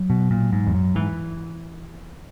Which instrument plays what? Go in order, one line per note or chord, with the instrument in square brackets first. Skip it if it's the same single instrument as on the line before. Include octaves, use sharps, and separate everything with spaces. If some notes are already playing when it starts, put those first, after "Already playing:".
Already playing: [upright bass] F#3
[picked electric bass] B2
A#2
G#2
E2
F#2
[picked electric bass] G#2 [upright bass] E3